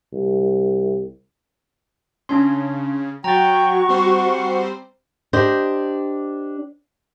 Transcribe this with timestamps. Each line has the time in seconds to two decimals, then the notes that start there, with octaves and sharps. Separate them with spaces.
0.13 C2
2.29 C#3 C#4 D4 C6
3.24 F#3 F#4 G5 A#5 C#6 A6
3.89 G3 C4 C5 F#5
5.33 D4 G4 C5 D5 D#5